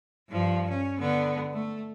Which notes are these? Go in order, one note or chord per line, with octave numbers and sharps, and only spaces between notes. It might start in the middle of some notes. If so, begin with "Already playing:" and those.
G2 F3
C#4
D3 B3
A3